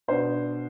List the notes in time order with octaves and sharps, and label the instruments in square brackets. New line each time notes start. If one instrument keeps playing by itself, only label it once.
[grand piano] B2 B3 D4 C5